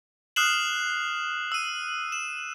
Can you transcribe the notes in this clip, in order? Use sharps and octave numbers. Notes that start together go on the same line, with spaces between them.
D#6 F6 F#6 C7 E7 F#7
E6 D#7
E7